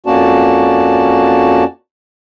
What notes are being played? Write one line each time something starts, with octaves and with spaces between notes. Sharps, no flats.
F2 A#3 C#4 F#4 D5 A5